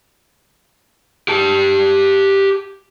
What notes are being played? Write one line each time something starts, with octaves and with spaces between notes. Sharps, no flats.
G4 A5